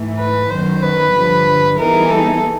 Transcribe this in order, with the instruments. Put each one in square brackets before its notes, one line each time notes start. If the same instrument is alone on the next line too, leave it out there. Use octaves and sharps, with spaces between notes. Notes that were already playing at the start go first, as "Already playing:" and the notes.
Already playing: [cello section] G#2 E3 A3
[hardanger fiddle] B4
[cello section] F#2 D#3 F#3 B3 [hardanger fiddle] C5
[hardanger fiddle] B4
[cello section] G2 D3 F3
[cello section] E3 G3 B3 D#4 G#4 [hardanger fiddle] A#4
[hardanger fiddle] A4